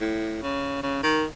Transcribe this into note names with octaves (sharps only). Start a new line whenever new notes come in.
A2
C#3
C#3
D#3